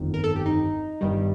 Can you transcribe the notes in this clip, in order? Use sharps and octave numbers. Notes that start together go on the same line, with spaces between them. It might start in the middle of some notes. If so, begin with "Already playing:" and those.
Already playing: G1 F2 D#3
A#4
A4
G4
D#4
G1 G2 D#3 G3